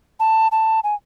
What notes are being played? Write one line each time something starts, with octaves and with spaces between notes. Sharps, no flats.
A5
A5
G#5